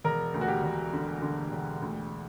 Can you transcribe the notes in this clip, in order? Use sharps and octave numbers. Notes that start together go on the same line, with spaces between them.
E1 A#4
D2
F#4
G4
E1
D3
D3
E1
D2